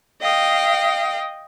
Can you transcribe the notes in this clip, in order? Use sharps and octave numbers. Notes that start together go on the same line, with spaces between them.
D#5 F5 G5